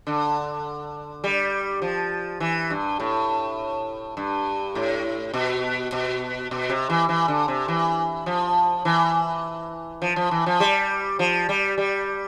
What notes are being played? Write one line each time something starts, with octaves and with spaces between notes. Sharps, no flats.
D3
G3
F3
E3
G2
A2
G2
A2
B2
B2
B2
C3
E3
E3
D3
C3
E3
F3
E3
F3
F3
E3
F3
G3
F3
G3
G3